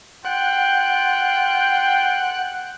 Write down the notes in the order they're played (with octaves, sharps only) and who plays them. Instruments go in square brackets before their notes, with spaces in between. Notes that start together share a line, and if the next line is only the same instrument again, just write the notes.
[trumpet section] F4 G5 [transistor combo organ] F#5